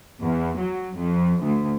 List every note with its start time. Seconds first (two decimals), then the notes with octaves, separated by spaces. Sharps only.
0.21 E2
0.59 F#3
0.97 F2
1.41 D2